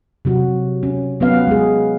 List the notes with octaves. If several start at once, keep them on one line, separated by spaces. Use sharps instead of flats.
C3 F#3 F#4
C#4
F#3 B3 C#4 B4 F5
G#3 G#4